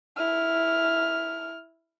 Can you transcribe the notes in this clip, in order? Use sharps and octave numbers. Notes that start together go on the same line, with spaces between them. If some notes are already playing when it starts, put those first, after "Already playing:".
E4 F6